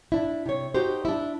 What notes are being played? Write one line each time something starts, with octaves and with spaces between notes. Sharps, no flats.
D4 E4
C3 C#5
D#4 F#4 G4 C5
D4 E4